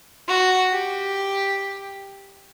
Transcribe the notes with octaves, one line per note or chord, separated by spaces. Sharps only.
F#4
G4